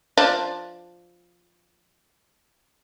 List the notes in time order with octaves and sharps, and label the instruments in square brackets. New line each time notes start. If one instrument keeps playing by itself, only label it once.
[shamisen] F3 D4